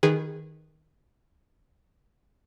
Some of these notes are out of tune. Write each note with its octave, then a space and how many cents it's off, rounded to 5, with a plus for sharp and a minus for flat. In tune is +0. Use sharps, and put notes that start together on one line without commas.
D#3 +0 G#4 -15 B4 +0